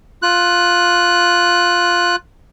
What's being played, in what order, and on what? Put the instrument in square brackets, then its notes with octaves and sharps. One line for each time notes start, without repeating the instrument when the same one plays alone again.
[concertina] F4 F#6